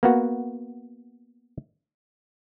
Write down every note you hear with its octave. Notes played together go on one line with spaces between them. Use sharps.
A#3 B3 F#4